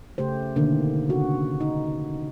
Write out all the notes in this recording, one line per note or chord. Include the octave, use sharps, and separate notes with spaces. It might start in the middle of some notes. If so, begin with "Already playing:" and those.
C#3 A3 G4 C5
B2 D3 D#3 A#3
C#3 F#4
D#4